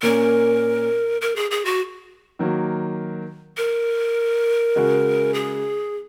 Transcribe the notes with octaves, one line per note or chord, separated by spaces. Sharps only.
A#2 A#3 C#4 A#4
A#4
G#4
G#4
F#4
D#3 F#3 A#3
A#4
C#3 G#3 F#4
G#4